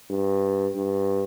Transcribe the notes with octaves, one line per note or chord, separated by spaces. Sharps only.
G2
G2